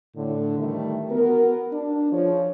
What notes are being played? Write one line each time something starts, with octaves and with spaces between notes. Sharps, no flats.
A2 D3
D#3 E3 G3 A3 D#4
B3 F#4 A#4
D4
F3 G#4 C#5